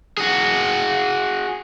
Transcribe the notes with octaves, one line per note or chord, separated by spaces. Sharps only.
F#4 G#4